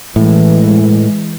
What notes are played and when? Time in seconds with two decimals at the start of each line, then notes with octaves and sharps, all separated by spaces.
0.16 A2 E3 G#3